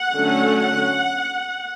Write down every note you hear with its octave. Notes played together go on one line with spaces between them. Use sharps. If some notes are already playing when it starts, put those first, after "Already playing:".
Already playing: F#5
D3 F#3 A3 C#4